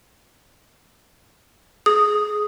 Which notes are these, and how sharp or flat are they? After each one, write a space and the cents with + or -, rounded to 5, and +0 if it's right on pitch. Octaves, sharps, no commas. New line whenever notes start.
G#4 +20 D#6 +0